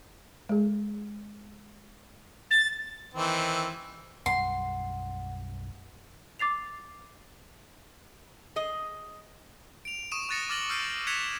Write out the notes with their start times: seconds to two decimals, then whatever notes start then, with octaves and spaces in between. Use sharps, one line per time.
0.49 G#3 G#4
2.51 A6
3.14 D#3 E3 C4
4.26 B1 F#2 G3 F#5 C6
6.39 D6 A6 C7 F7
8.56 G#4 D#5
9.85 D7 F7
10.12 C#6 D#6 D#7 E7
10.29 C#6 F#6 A6 A#6 C#7
10.49 D6 F6 A6 A#6 F#7 G7
10.69 E6 F6 G6 C7 D7 D#7
11.07 F#6 G#6 B6 C#7 E7 F7